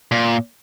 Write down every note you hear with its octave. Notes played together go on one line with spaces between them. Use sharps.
A#2